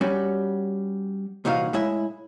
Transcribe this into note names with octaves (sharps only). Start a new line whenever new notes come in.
G3 C#4 F#4 G4
C2 A#2 E3 D#4 F#4 F5
A2 G#3 E4 E5